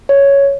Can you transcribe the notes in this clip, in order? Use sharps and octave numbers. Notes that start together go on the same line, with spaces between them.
C#5